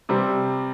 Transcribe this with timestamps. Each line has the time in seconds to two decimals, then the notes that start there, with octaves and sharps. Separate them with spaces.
0.09 C3 G3 C4 G4